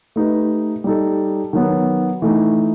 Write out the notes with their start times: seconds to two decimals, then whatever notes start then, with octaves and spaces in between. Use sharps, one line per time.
0.16 A3 D#4 G4 B4
0.84 G3 D#4 A4
1.53 D#3 F#3 B3
2.22 E3 A3 D#4